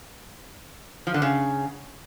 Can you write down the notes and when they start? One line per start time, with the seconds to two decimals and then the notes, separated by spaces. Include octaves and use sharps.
1.07 F3
1.14 D3
1.22 C#3